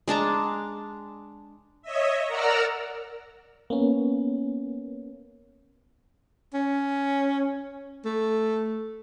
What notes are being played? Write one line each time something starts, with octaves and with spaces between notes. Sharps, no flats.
G#3 D4 A5 A#5
C#5 D#5 E5
A#4 D5 F#5 A#5 E6 F6
A#3 B3 C#4
C#4
A3